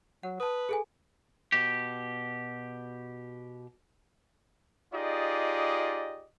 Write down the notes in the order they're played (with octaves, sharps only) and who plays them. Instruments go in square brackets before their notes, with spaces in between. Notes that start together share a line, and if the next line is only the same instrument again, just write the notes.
[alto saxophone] F#3 [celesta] F#5
[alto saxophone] B4 [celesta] A5 D#6
[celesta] G#4 A4 G#5
[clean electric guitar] B2 G4
[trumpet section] D#4 F4 G4 G#4 D5 D#5